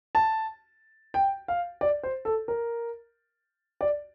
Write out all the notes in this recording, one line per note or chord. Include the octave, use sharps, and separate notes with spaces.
A5
G5
F5
D5
C5
A4
A#4
D5